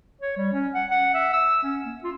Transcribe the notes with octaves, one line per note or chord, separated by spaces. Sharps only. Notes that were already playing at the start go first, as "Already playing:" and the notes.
C#5
G3
C#4
F#5
F#5
E5
E6
C#4
A#3
F4